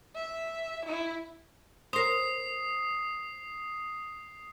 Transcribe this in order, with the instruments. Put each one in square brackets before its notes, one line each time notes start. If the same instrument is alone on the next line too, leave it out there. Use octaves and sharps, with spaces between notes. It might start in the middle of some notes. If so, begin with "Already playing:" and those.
[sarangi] E5
E4
[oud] A#4 C5 [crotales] D#6 C7